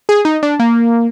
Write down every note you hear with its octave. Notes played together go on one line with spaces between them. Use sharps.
G#4
D#4
D4
A#3